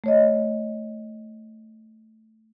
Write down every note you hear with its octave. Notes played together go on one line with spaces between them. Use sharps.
A3 C#5 D#5